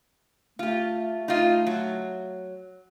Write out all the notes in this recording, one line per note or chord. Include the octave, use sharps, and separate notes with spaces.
A3 F4 G4
D#4 F4
F#3